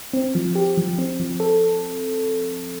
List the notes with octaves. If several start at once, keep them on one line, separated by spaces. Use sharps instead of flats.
C4
F3
G4
F3
C4
F3
A4